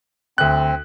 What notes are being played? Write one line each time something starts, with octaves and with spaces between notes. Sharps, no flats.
D2 C4 F#6